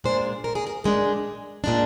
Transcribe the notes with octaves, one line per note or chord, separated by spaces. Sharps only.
A#2 G#3 D4 C5
A#4
G#4
A#4
A#2 G#3 D4
A#2 G#3 D4